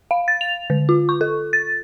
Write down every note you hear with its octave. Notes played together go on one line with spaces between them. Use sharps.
F5
A6
F7
D3
F4
C#6
A4
A6